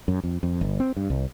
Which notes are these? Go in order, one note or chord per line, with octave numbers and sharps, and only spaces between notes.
F#2
F2
F2
G1
C4
G2
C2